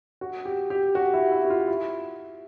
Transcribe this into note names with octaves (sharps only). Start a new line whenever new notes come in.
F#4
G4
G4
F#4
E4
E4
F#4
F4
E4